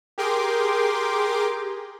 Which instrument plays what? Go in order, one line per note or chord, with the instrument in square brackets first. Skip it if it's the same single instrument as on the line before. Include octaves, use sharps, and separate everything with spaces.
[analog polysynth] G4 G#4 A#4 G5 C6 D6